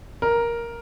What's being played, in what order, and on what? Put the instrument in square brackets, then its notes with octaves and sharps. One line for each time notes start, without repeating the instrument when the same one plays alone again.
[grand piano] A#4